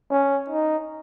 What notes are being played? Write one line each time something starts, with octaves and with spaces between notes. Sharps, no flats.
C#4
D#4